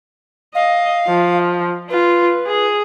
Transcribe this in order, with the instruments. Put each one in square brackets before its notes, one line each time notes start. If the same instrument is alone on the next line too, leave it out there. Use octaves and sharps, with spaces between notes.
[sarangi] D#5 [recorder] F5
[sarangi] F3
[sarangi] F4 [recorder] B4
[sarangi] G#4